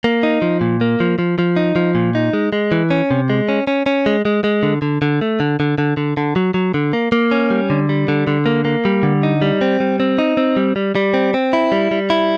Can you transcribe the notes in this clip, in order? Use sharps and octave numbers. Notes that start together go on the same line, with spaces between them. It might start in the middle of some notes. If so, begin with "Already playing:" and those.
A#3
D#4
F3
A#2
A#3
F3
F3
F3
D#4
F3
A#2
D#4
G#3
G#3
E3
C#4
C3
G#3
C#4
C#4
C#4
G#3
G#3
G#3
D3
D3
D3
A3
D3
D3
D3
D3
D3
F#3
F#3
D3
A#3
A#3
C#4
G3
D3
G3
D3
D3
A#3
A#3
G3
D3
D#4
G3
C4
G3
C4
D#4
C4
G3
G3
G3
C4
C4
E4
G3
G3
E4